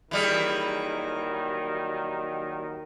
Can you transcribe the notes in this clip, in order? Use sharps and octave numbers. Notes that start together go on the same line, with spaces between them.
D#2 D#3 E3 F#3 G3 G#4